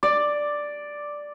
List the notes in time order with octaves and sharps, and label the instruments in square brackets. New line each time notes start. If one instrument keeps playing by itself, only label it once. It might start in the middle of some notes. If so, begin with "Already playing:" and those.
[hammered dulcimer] D5